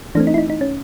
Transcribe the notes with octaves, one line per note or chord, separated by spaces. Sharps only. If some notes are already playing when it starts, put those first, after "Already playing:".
E3 A3 C4 D4
D#4
E4
D#4
D#4
C#4